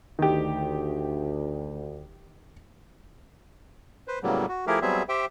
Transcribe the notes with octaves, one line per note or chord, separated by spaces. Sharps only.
D2 D#3 G4
B4 C5
A2 C#3 F#3 G3 A#3 B3
F#4
F3 A3 E4 G4 G#4 A#4
F#3 G3 B3 C4 G#4 E5
G4 C5 E5 G5